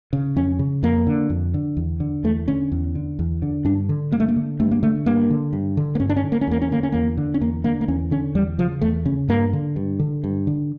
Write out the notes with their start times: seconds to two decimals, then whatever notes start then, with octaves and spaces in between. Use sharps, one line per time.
0.13 C#3
0.36 F2 C#4
0.59 C#3
0.83 F2 A#3
1.07 D3
1.30 F2
1.54 D3
1.77 E2
2.00 D3
2.24 E2 A3
2.48 D3 C#4
2.72 E2
2.95 D3
3.19 E2
3.42 D3
3.65 G2 D4
3.89 D3
4.12 G2 A#3
4.20 A3
4.29 A#3
4.36 D3
4.60 G2 A3
4.71 A#3
4.83 D3 A3
5.06 G2 A#3
5.30 D3
5.53 G2
5.77 D3
5.95 A#3
6.00 G2 C#4
6.09 D4
6.16 C#4
6.23 D3
6.32 A#3
6.41 C#4
6.47 E2 A#3
6.62 C#4
6.71 D3 A#3
6.83 C#4
6.92 E2 A#3
7.17 D3
7.34 C#4
7.41 E2 A#3
7.64 D3 A#3
7.81 A#3
7.88 E2 C#4
8.11 D3 C#4
8.35 E2 G3
8.58 C#3 F3
8.81 E2 A3
9.05 C#3 C#4
9.28 G2 A#3
9.53 D3
9.76 G2
10.00 D3
10.24 G2
10.47 D3